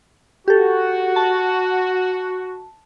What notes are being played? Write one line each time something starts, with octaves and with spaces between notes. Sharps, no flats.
F#4 G4 A4
A5